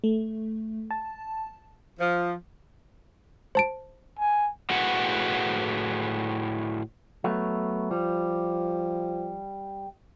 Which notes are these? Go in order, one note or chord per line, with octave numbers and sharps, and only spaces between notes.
A3
A5
F3
C5 A5 D7
G#5
A2 F#4 G#4 B4 F#5
F#3 A3 B3
F3 G3